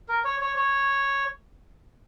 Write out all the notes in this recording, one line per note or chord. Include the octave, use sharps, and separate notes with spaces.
A#4
C#5
C#5
C#5